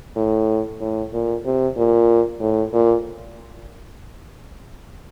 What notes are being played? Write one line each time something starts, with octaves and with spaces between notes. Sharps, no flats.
A2
A2
A#2
C3
A#2
A2
A#2